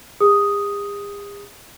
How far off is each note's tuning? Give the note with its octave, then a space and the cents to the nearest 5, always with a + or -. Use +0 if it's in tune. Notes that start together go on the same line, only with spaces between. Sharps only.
G#4 -45 D#6 +0